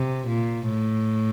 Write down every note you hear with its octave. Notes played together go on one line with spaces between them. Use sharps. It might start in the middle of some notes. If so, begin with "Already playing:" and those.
Already playing: C3
A#2
A2